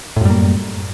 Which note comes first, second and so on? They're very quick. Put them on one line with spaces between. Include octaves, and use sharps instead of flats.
A2 F#2 G3 A#3